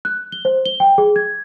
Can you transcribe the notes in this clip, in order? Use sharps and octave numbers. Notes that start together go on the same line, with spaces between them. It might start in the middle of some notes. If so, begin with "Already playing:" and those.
F#6
G7
C5
G7
G5
G#4
G#6